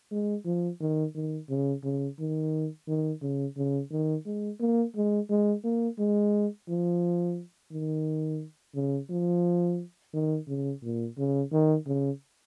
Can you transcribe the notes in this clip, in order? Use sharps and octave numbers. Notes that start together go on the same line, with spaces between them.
G#3
F3
D#3
D#3
C#3
C#3
D#3
D#3
C#3
C#3
D#3
G#3
A#3
G#3
G#3
A#3
G#3
F3
D#3
C#3
F3
D#3
C#3
A#2
C#3
D#3
C#3